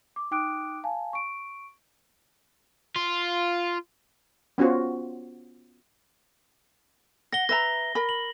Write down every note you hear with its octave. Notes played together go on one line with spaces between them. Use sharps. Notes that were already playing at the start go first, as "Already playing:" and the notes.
D6
D#4 G5 D6 D#6 F#6 D7
F5 G#5 A5
C#6 D7
F4
B3 C#4 F4 F#4 C5
F#5 A#6 G7
B4 E5 A#5 A#6
A#4 B5
F#7